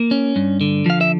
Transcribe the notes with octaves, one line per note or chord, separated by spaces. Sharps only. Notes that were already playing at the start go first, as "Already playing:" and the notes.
Already playing: A#3
C#4
G2
D3
F3 F5
E5